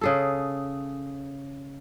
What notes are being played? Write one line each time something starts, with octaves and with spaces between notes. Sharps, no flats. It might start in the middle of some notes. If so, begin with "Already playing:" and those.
C#3 G#4 A4